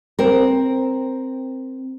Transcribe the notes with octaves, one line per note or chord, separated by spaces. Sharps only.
C4 A#4